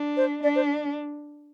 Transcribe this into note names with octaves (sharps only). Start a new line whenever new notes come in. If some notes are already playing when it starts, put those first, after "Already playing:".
Already playing: D4
C5
D4 D5
C5